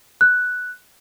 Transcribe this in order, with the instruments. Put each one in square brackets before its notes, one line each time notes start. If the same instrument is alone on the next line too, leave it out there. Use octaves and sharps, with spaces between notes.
[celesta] F#6